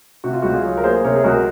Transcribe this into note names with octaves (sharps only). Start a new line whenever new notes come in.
C3 F#4
F4
C#2 F#4
F4 G#4
F#3
A#4
A#3 G#4 C5
C3 A#4 C#5
G#4
C#2 F#4 A#4